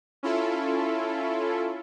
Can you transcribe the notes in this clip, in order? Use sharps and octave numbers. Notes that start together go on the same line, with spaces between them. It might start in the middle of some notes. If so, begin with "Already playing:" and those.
C#4 E4 F4 A4